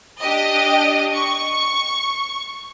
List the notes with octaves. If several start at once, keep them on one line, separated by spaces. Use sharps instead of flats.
D4 G4 D#5
C#6